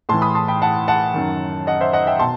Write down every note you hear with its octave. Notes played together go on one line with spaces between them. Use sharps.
A2 E3 A5 C6
B5 D#6
A5 C6
G5 B5
F#5 A5
F#5 A5
F#2 D#3
D#5 F#5
C5 E5
D#5 F#5
E5 G5
B2 A5 C6